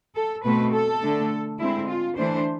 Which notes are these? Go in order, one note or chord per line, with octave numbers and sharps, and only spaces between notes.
A4
B2 A3 C4 B4
A4
D3 A3 D4
D3 G#3 C4 E4
F4
E3 A3 D4 C5